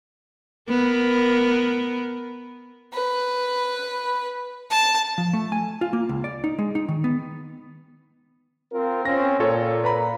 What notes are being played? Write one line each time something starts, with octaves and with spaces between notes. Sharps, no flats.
B3 A#4
B4
A5
F3
A3
G#5
F4
A#3
C#2
D5
D#4
G#3
D#4
D#3
B3
C4 F4 A#4
C4 C#4 A#6
A#2 F4 A4 C#5
B4 A#5 B5